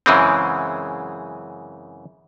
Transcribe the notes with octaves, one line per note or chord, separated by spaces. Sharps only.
F#2 C#3 E3 G#3 C4